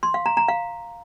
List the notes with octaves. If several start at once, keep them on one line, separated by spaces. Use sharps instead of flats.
C6
F5
A#5
A#5
F5